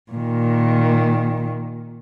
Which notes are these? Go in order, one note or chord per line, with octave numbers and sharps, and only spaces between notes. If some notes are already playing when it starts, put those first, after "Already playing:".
A#2 D#3